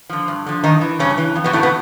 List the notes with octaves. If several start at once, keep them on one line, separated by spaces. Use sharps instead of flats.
D3 F3
G2
D3 F3
G2 D#3 D#4
E3
G2 C#3 C#4
E3
F2
B2 B3
A2 C#3 E3 A3
B2 B3